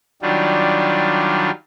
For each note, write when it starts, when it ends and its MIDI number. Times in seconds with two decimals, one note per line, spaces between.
0.22 1.50 51
0.22 1.50 54
0.22 1.50 55
0.22 1.50 62
0.22 1.50 65